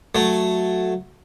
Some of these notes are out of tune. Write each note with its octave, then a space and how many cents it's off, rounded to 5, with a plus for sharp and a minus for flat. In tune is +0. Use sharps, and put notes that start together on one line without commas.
F#3 -5 A3 +0